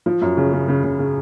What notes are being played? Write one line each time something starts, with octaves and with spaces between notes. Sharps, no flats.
F3
F#2
C#3
C#3
C#3
C#3
C#3